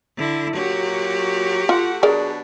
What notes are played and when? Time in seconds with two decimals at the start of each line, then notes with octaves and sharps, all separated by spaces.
0.18 D3 E4
0.56 A#2 F#3 F#4 G4
1.69 A3 F4 F#5
2.03 B2 F#3 D4 G#4 A#4 D5